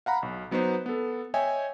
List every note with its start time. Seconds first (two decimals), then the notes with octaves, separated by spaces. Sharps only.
0.06 F5 F#5 A#5 B5
0.23 B1
0.51 F#3 B3 D#4 B4 C5
0.86 B3 A4
1.34 C#5 D#5 E5 G5 G#5